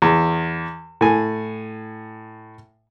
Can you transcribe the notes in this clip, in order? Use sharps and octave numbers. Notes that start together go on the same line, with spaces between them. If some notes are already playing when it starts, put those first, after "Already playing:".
E2
A2 G#5